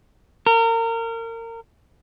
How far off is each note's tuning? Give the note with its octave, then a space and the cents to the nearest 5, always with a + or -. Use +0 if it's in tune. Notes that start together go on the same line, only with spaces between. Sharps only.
A#4 -30